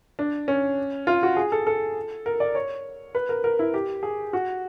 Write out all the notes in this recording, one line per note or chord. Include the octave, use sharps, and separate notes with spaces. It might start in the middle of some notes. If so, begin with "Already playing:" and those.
D4
C#4
F4
F#4
G#4
A4
A4
A#4
D5
C#5
B4
A#4
A#4
E4
G4
G#4
F#4